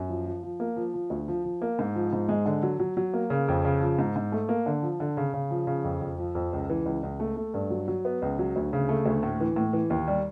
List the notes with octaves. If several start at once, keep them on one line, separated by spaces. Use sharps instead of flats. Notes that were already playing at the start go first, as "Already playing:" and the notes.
Already playing: F#2
F3
F3
F3
A#3
F3
F3
D2
F3
F3
A#3
G#2
F3
G#2
G#3
D3
F#3
F#3
F#3
A#3
C#3
F2
C#3
F3
G#2
G#2
A3
A#3
D3
F3
D3
C#3
C#3
F3
C#3
F2
F2
F3
F2
C#2
E3
C#2
C#2
A3
A3
G2
F#3
F#3
B3
C#2
F#3
D2
C#3
A3
D2
A2
E3
A2
E3
D#2
G3